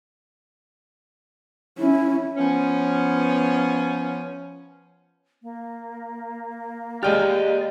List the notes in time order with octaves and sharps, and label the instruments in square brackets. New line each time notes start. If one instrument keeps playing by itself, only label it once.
[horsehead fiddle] C#4 [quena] E4
[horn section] F3 B3 C#4
[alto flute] A#3
[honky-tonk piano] G#3 G5 F6 [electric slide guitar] G4 D#5 [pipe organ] D5